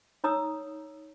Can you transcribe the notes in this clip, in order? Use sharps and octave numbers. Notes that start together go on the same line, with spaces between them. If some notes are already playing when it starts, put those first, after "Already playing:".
D#4 C#5 A#5 D#6 E6